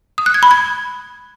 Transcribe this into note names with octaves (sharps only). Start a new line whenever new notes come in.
D#6
F#6
G#6
B5
G#6